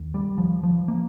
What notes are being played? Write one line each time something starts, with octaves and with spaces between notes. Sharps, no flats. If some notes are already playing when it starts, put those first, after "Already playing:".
Already playing: D#2
G3
F3
F3
A#3